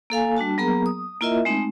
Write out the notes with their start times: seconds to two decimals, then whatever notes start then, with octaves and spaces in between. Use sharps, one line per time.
0.10 A#3 A4 F5 G#5
0.36 G3 D4 F#4 A5
0.58 F#3 A#3 B3 G#4 A#4 A#5
0.86 D#6
1.21 A#3 E4 F4 A#4 D#5 E5
1.45 G#3 A3 C4 D#4